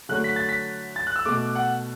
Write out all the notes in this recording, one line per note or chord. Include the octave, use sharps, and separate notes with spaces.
D3 F#3 A3 F#6
B6
A6
B6
A6
F#6
E6
B2 A3 D6
F#5